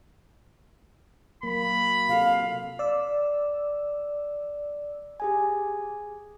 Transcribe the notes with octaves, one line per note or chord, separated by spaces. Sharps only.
F#3 A#3 B5
C3 F4 A4 F5
D5 E6
G4 G#4 G#5